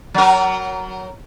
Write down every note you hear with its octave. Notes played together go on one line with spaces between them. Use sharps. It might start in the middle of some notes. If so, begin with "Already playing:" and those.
F#3 A#4